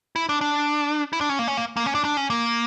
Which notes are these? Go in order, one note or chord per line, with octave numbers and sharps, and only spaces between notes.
E4
D4
D4
E4
D4
C#4
A#3
C#4
A#3
A#3
C#4
D4
D4
C#4
A#3